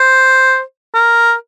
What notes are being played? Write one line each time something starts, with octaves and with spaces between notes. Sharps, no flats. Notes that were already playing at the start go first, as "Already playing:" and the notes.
Already playing: C5
A#4